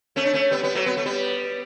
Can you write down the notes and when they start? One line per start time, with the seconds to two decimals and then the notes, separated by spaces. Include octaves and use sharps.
0.16 A3 C#4
0.25 D4
0.33 A3 C#4
0.51 G3 B3
0.63 G3 B3
0.75 F#3 A3
0.86 B3
0.97 A3
1.06 G3 B3